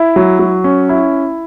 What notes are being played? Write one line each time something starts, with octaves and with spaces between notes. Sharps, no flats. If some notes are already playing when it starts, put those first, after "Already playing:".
Already playing: E4
F#3
F#3
C#4
E4